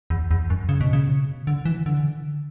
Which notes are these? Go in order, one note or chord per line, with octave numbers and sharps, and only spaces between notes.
E2
E2
F#2
C#3
B2
C#3
D3
E3
D3